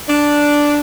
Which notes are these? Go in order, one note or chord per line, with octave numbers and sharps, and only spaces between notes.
D4